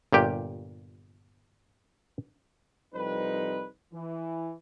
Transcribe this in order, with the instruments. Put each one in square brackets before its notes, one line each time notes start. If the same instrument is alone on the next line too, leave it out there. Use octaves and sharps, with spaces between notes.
[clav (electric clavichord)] G1 A#2 G4 G5
[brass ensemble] C2 F2 G3 C4 D#4 B4
E3